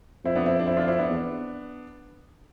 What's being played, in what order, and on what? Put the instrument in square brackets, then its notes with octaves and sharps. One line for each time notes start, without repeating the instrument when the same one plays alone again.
[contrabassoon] F2 [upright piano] C4 E4
[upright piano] B3 D4
C4 E4
D4
C4 E4
D4 F4
C4 E4
B3 D4
[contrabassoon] E2